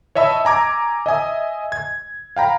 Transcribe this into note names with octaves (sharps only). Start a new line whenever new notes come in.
C#5 D#5 E5 A5 B5 E6
G#5 A#5 D6 G#6
D#5 E5 G#5 D#6
G#6
F5 G5 A#5 B5